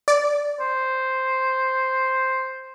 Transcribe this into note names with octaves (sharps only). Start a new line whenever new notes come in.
D5
C5